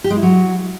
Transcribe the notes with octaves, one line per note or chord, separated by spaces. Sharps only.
G4
G#3
E4
F#3